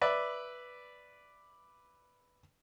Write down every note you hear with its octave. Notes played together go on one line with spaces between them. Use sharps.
B4 D5 E5